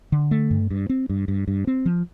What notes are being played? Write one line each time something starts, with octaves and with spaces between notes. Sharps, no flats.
D3
A3
G2
G2
C4
G2
G2
G2
C4
F3